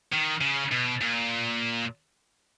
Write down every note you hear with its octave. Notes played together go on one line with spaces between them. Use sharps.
D#3
C#3
B2
A#2